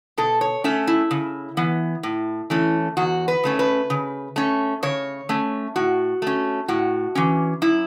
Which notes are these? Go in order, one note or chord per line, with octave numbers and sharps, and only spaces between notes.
B2 A4
C#5
A3 C#4 E5
E4
C#3
E3 B3
A2
E3 A3 C#4
E2 F#4
B4
C#3 A3 C#4
B4
C#3
A3 C#4
C#3 C#5
A3 C#4
A2 F#4
A3 C#4
A2 F#4
E3 C#4
F#2 E4